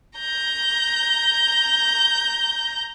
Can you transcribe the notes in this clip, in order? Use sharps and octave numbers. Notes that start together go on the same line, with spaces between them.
A#5 G6